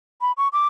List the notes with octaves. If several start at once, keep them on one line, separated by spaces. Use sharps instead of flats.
B5
C#6
D6